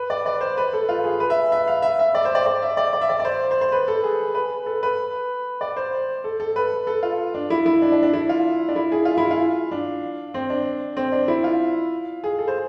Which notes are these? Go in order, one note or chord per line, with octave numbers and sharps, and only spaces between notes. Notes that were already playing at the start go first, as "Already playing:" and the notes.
Already playing: B4
D5
D5
C5
B4
A4
F4
G#4
B4
E5
E5
F5
E5
E5
D5
C5
D5
D5
E5
D5
D5
E5
D5
D5
C5
C5
C5
B4
A4
G#4
B4
A4
B4
D5
C5
A4
A4
B4
A4
F4
D4
E4
E4
D4
D4
D4
E4
F4
D4
E4
G#4
F4
E4
F4
D4
C4
D4
C4
D4
E4
F4
G#4
A4
C5